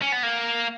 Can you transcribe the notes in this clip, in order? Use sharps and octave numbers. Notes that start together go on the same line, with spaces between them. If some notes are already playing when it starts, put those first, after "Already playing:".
C#4
B3
A#3